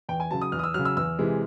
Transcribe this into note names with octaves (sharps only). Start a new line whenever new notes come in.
E2 G5
G#5
C#3 F#3 A5
D#6
E2 F6
D#6
E6
C#3 F#3 F6
E6
E2 E6
C3 E3 G#3